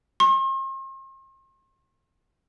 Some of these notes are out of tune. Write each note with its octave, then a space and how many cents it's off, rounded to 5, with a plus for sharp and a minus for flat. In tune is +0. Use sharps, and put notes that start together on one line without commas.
C6 +45